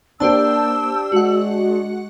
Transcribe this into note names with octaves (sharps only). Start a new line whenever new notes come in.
A#3 D4 G4 C5 A5 E6
G#3 F#4 F#5